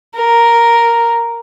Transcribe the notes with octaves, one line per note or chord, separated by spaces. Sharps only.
A#4